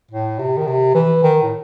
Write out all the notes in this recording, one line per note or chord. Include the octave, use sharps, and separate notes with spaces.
A2
C3
D#3
C3
E3
D#3
A2